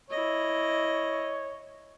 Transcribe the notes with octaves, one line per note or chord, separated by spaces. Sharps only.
E4 C#5 D#5